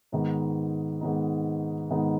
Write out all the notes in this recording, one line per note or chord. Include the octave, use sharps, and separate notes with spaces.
G#2 D#3 B3 D#4
G#2 D#3 B3 D#4
G#2 D#3 B3 D#4